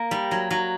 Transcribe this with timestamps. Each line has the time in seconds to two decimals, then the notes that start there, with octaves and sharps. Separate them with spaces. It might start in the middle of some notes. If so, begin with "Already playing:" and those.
Already playing: A#3
0.11 G3
0.31 F#3
0.51 F#3